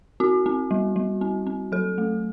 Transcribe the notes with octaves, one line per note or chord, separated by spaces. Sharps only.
C4 F#4
C4
G3
G3
C4
C4
F#3 A4
A3